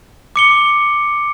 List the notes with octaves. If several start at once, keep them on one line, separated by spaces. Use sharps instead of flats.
D6 C#7 G7